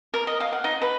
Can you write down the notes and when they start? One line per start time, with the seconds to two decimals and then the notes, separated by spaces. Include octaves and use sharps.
0.14 A#4
0.27 D#5
0.40 F5
0.52 F#5
0.64 D#4
0.82 B4